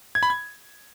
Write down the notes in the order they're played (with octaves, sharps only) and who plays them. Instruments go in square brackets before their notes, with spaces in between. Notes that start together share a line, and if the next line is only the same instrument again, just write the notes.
[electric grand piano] G#6
B5
G#6